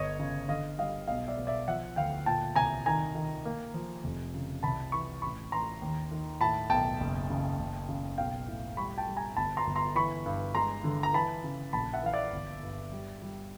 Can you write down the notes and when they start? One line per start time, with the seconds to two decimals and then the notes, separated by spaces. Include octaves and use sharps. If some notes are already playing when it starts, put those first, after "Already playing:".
Already playing: G1 C#5 D#5
0.19 C#3
0.48 D3 D#5 F5
0.78 G3 D#5 F5
1.07 B1 D#5 F5
1.27 D5 E5
1.38 B2
1.47 D5 E5
1.68 F3 E5 F#5
1.96 D2 F5 G5
2.26 A#2 G5 A5
2.56 C2 G#5 A#5
2.86 D#3 G#5 A#5
3.15 D#3
3.45 A#3
3.74 F3
4.04 F1
4.34 C#3
4.63 C2 A5 B5
4.92 E3 B5 C#6
5.22 A1 B5 C#6
5.52 A1 A#5 C6
5.82 D#2
6.11 D#3
6.41 A2 A5 B5
6.70 B1 G5 A5
7.00 F#1
7.30 C#3
7.59 F#1
7.89 C#3
8.18 B1 F5 G5
8.47 A2
8.77 G3 B5 C#6
8.98 G5 A5
9.07 G3
9.17 G#5 A#5
9.37 G1 A5 B5
9.57 A#5 C6
9.67 G1
9.76 A#5 C6
9.95 E3 B5 C#6
10.26 G2
10.54 G#3 A#5 C6
10.84 D3
11.03 A#5
11.14 E3 A5 B5
11.44 C#3
11.73 A#1 A5 B5
11.93 E5 F#5
12.02 E3 F5
12.13 D5 E5
12.32 G1
12.63 G2
12.92 G3
13.22 G3